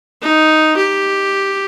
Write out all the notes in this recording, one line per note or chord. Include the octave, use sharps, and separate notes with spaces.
D#4
G4